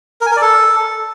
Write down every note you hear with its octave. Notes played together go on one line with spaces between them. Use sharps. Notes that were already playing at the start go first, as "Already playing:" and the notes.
A#4
G#5
A#4
D5
A4